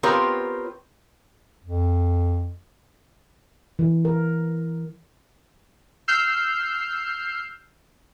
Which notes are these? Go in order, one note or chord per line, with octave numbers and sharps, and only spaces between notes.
B3 C4 F4 G4 A#4 C#5
F2
E3
A#4
E6 F6 G6 C7